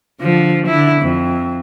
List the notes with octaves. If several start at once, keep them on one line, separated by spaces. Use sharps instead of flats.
D3 F3
D3 E4
F2